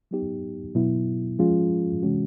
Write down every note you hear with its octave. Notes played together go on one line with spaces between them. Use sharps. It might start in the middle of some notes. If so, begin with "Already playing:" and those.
F#3 B3 D#4 G4
B2 F#3 B3 E4
F3 G#3 C#4 F4 G#4
C3 E3 G#3 C#4 F#4